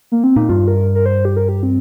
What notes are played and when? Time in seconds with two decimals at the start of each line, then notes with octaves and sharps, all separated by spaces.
0.12 A#3
0.24 C4
0.36 A#2 D#4
0.49 G2 F4
0.68 A#4
0.95 A#4
1.06 C5
1.25 G4
1.37 A#4
1.49 G4
1.63 C4